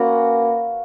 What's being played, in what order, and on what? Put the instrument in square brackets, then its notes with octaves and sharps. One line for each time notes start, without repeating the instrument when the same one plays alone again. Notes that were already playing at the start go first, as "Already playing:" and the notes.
Already playing: [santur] A#3 C#4 F#4 B4